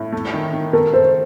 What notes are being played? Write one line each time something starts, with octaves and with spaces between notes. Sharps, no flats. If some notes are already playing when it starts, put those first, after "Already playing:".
Already playing: A2
A3
D#3
D#3
A3 A#4
A4 C5